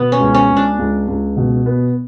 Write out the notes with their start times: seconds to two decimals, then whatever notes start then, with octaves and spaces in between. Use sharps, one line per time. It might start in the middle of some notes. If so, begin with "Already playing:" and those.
Already playing: B2 B3
0.12 C#4
0.20 C#2
0.34 C#4
0.50 C#2
0.57 D4
0.79 C#2
1.08 C#2
1.37 B2
1.66 B3